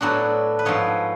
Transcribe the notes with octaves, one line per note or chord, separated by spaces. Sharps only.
A2 F#3 B3 D4 F#4 A4
B4
G#2 F3 B3 A4 C#5